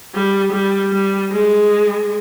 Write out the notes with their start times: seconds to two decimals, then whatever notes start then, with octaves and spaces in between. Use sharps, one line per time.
0.15 G3
0.53 G3
0.92 G3
1.31 G#3